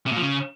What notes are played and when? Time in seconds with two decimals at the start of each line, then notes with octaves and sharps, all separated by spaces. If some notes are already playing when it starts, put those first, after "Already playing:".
0.07 C3
0.12 A#2
0.17 F3
0.22 C#3